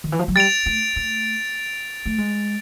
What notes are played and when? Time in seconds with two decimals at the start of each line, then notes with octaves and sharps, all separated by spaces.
0.04 D#3
0.12 E3
0.19 F3
0.28 F#3
0.35 G3 A6 D7 F7
0.66 A3
0.96 A3
2.06 A3
2.18 G#3